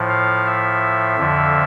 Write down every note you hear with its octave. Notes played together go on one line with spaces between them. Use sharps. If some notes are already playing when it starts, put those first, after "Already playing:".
Already playing: A2 F3
F5
E5
F2 D3 F3